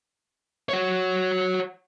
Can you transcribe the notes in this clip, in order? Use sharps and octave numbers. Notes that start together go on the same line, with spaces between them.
F#4 C#5